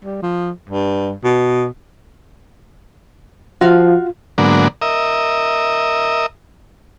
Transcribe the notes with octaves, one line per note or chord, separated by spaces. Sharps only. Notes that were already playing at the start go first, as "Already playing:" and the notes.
G3
F3
G2
B2
F3 F4 F#4 F5
G#2 D3 F#3 A#3 B3 D4
A#4 D#5 E5